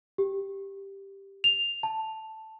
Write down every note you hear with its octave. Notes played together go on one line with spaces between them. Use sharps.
G4
F7
A5